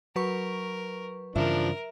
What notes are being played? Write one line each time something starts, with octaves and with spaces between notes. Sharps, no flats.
F#3 A#4 B4 C#6
G2 C#3 E3 F3 D4 A#4 E5